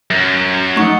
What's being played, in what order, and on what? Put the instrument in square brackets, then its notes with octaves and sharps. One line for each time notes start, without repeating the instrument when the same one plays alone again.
[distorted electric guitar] F#2
[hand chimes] A3 C#6 [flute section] D#4 A4 F#5